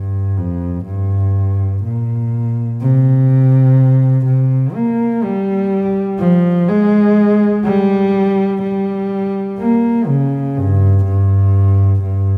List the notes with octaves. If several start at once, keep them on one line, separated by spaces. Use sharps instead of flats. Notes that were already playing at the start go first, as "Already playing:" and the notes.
Already playing: G2
F2
G2
A#2
C3
C3
A#3
G3
F3
G#3
G3
G3
A#3
C#3
G2
G2
G2